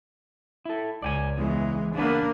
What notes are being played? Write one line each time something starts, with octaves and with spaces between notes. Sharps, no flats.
E4 A4
C#2 D5 G5 G#5
E2 C#3 E3 G#3
C#3 A#3 B3 D4 B4